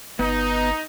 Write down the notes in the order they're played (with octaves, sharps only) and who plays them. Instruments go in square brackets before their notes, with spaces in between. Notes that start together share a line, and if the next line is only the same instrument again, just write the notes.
[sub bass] G1 [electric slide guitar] B3 [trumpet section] D#4